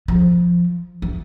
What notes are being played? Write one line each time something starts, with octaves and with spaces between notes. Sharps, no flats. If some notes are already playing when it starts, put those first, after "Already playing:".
F3
E3